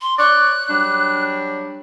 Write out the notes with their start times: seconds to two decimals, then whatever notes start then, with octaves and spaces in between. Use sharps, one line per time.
0.01 C6
0.18 C#5 D5 F#6
0.70 F#3 G3 D4